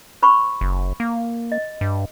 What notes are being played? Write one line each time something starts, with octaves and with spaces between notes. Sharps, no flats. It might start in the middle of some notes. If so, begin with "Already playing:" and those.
C5 B5 C#6
F#1
A#3
D#5
G2